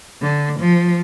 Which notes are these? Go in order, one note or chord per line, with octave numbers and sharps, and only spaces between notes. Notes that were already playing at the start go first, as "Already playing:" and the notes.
D3
F3